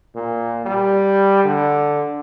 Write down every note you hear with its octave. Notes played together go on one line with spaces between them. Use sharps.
A#2
G3
D3